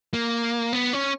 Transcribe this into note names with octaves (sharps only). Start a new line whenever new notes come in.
A#3
B3
C#4